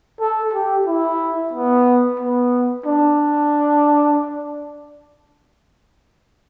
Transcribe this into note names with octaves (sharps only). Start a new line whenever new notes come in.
A4
G4
E4
B3
B3
D4